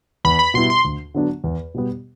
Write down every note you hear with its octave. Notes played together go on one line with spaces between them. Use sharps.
E2 B5
B5
B2 G3 B3 E4 C6
C6
D2
D3 F#3 B3 D4
E2
B2 G3 B3